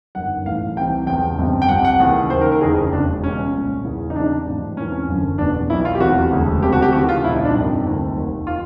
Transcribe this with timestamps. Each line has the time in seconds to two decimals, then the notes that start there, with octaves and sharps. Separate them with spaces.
0.15 G1 F#2 D#3 F#5
0.45 A1 A2 E3 F5
0.76 C2 C3 E3 G5
1.07 E2 C#3 F3 G5
1.38 G1 F2 C3 F3
1.62 G5
1.69 C2 C3 F3 F#5
1.85 F#5
2.00 D#2 C#3 E3
2.30 D#2 D#3 C5
2.41 A#4
2.52 A#4
2.61 F1 F2 C#3 E3 G#4
2.92 E1 D#2 C#3 D4
3.22 C#2 B2 C#4
3.53 C2 A#2 F3
3.84 E2 C#3 E3
4.10 D#4
4.16 E2 C3 F3 D4
4.46 A1 G#2 F3
4.77 E2 C3 E3 C#4
4.92 C#4
5.08 F#1 F#2 D3 F3
5.38 F1 E2 B2 D4
5.69 B2 E4
5.72 B1
5.85 F4
5.95 G4
6.00 F1 E2 C3 E3 F#4
6.31 E1 D2 C#3
6.62 D2 C3 F3 G4
6.73 F#4
6.82 G4
6.93 D#2 C#3 E3 F#4
7.09 F4
7.24 C2 A#2 F3 E4
7.33 D#4
7.45 D4
7.54 G1 F2 C3 D#3
7.85 D2 C3 D#3
8.16 F1 D#2 D#3
8.47 D#3 F4